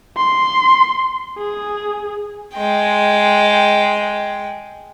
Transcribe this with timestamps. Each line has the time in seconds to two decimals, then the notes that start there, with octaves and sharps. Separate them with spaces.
0.17 C6
1.38 G#4
2.54 G#3 G5